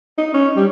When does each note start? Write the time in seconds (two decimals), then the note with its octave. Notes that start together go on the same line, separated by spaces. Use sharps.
0.18 D#4
0.34 C#4
0.57 G3